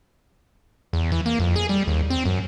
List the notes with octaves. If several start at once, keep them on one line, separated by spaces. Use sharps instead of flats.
E2
E3
A#3
F2
G#4
G3
D#2
C4
F#2